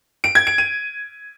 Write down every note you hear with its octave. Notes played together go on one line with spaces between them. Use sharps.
D7
G#6
D7
D#7